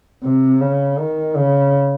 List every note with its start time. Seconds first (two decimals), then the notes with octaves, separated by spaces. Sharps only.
0.24 C3
0.61 C#3
0.99 D#3
1.36 C#3